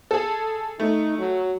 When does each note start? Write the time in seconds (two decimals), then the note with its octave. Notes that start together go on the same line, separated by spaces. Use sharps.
0.11 G#4 A4
0.80 A3 D#4
1.18 F#3